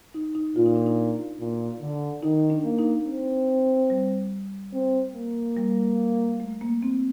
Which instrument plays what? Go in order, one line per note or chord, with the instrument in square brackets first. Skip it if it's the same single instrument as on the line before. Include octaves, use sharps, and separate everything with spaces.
[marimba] D#4
D#4
[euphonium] A#2 [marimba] F4
[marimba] D#4
D4
D#4
[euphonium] A#2
D3
[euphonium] D#3 [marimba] D#4
[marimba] D4
[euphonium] A#3
[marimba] D#4
[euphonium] C4
[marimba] G3
[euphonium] C4
A#3
[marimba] G3
A3
A#3
C4